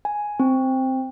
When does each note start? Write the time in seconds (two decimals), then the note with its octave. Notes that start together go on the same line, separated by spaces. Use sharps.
0.05 G#5
0.40 C4